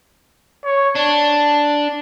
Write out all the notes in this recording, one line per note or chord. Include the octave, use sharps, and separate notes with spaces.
C#5
D4 A5